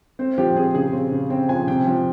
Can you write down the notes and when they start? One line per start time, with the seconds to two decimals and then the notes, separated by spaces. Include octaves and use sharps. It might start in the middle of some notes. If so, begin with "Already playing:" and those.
0.19 C4 C5
0.38 F3 G4
0.56 C4 G#4
0.75 C#3 G#4
0.93 C4
1.12 C#3
1.30 C4 G5
1.49 F3 G#5
1.67 C3 G5
1.87 F3